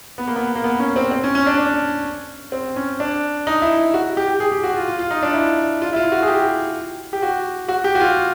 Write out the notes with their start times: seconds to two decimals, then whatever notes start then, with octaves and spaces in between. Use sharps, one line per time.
0.18 B3
0.28 A#3
0.36 B3
0.55 A#3
0.64 B3
0.80 C#4
0.96 C4
1.11 C4
1.24 C#4
1.35 C#4
1.46 D4
1.58 D4
2.52 C4
2.76 C#4
3.00 D4
3.47 D#4
3.62 E4
3.94 F#4
4.17 G4
4.29 G4
4.40 G#4
4.52 G4
4.63 F#4
4.76 F4
4.88 F4
4.99 F4
5.11 D#4
5.23 D4
5.34 E4
5.82 F4
5.93 E4
5.96 F4
6.12 F#4
6.22 G#4
6.28 G4
7.13 G4
7.22 F#4
7.68 F#4
7.84 G4
7.95 F#4
8.00 F4